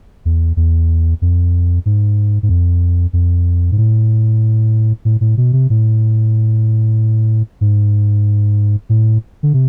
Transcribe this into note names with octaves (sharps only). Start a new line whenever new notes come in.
E2
E2
F2
G#2
G#2
F2
F2
G#2
A2
A2
A2
B2
C3
A2
G#2
A2
D3
C3